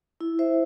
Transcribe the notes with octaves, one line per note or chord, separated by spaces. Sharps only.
E4
C5 E5